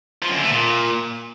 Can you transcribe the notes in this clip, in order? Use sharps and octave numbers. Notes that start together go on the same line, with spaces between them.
F3
F#2
D3
A3
A#2